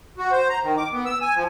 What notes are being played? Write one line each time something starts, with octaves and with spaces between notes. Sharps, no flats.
F#4
C5
A#5
D#3
D6
B3
E6
G#5
F3